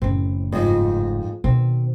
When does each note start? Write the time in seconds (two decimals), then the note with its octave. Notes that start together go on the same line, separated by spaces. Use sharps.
0.02 F#1 A2 C4
0.52 F2 G#2
1.44 B2 D#3 C4